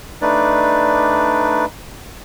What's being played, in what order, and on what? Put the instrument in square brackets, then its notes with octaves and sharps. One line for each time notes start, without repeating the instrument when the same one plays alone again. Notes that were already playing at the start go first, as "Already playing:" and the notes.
[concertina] A3 D4 D#4 B4 D5